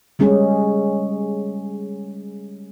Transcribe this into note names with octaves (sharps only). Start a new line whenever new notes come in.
G3 G#3 C#4 G#4